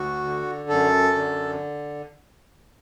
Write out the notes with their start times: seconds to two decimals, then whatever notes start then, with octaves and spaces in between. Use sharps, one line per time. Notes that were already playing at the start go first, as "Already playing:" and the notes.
Already playing: D2 F#4
0.24 D3
0.69 F#2 A4
1.15 D3